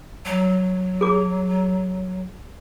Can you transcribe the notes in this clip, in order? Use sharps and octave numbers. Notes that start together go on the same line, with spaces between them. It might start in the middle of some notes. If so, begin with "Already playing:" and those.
F#3
G#4 D6